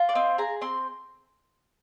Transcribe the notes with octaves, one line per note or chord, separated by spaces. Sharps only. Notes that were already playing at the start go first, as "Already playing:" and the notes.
Already playing: F4
D5
C4 D#5
G#4 A#5
C4 C6